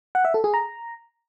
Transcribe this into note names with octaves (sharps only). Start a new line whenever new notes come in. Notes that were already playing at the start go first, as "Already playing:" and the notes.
F#5
E5
A4
G#4
A#5